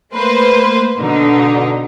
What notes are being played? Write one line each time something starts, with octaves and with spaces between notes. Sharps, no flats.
A3 A#3 B4 C5
B2 D3 D#4